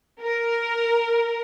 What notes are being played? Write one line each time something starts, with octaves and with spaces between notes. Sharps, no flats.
A#4